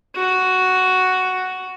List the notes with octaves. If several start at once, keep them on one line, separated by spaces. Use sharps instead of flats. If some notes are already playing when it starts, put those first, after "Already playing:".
F#4